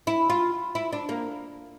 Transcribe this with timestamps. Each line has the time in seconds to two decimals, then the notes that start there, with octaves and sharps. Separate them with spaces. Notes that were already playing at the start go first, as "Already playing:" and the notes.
0.07 E4
0.30 F4
0.75 E4
0.93 D4
1.09 A#3